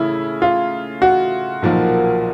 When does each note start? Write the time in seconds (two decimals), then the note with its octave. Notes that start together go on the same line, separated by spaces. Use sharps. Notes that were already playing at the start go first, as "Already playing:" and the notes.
Already playing: C#3 A3 E4
0.42 F4
1.02 F#4
1.62 B1 A#2 F3 A#3